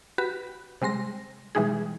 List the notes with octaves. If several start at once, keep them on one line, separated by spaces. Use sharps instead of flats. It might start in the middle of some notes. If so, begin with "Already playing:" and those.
F#4 G4 B4 B5
C3 G3 G#3 C6 A#6
B2 E3 G3 G#3 D#4 G#4